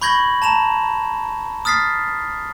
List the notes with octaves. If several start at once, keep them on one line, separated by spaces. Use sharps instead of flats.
B5 C#6 G6 G#6 A#6 F#7
A5 A#5 E7 F7
D#6 F6 A6 B6 C7